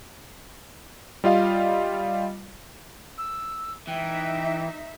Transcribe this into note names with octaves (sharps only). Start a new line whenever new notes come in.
G3 F4 D#5 F5
E6
E3 D#4 E5 G5